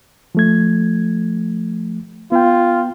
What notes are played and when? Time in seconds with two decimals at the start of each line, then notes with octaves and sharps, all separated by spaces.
0.35 F3 A3 G#6
2.32 B3 F4 G5